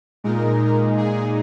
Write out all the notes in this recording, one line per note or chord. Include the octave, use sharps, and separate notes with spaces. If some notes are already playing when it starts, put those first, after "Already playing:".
A#2 G#3 D#4 A#4
G#4